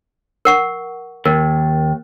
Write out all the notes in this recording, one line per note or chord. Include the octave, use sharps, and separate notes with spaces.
A#4 F#5 C#6
D#2 A#4